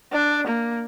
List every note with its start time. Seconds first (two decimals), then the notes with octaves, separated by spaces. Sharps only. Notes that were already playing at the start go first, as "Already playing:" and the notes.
0.13 D4
0.47 A#3